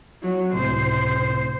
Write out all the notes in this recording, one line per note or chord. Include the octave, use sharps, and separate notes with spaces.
F#3
C#2 A2 C3 C5